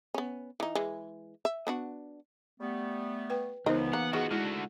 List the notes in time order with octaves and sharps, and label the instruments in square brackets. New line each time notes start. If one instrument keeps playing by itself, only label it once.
[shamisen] B3 C#4
E3 D#4
E3 G#3
E5
B3 D4 F#4
[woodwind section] G3 A3 B3
[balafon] B4 G5
[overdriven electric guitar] C#2 [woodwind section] C#3 E3 B3 [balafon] D#4 C5 [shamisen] A#4 D#5
[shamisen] A#3 [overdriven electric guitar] F#5
[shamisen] D#3 [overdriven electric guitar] F3 F#4 [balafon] G#4
[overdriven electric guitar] D3 F#4 [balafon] G#3 E4